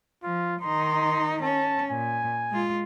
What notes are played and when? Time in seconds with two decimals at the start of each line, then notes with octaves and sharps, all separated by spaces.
0.24 F3 F4
0.62 D#3 D#4 C6
1.43 C#4 A5
1.90 A#2 G#5
2.50 G#3 F4